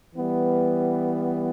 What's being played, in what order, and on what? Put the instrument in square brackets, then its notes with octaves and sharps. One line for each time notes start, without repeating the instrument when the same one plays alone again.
[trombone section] E3 G3 B3